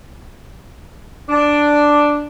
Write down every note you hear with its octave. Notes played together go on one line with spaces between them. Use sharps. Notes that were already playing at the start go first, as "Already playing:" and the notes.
D4